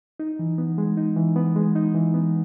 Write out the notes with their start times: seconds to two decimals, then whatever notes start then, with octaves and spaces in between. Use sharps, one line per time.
0.20 D#4
0.39 E3
0.58 B3
0.78 G#3
0.97 D#4
1.16 E3
1.36 B3
1.56 G#3
1.76 D#4
1.94 E3
2.14 B3